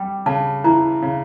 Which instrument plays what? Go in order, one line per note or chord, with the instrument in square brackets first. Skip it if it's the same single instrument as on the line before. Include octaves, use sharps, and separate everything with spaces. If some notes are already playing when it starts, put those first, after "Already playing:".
Already playing: [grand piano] G3 [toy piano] G5
[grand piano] C#3 [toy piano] A5
[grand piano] E3 [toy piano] A#5
[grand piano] C#3